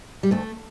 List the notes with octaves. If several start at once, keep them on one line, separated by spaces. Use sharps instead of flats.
G3
D2 A3